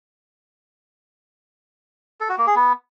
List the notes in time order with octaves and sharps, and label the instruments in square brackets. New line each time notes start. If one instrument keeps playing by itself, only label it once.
[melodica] A4
F#4
A#3
G#4
B3